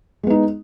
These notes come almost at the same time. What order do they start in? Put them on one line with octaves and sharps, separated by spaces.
G#3 B3 D#4